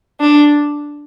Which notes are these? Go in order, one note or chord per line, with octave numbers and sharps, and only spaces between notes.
D4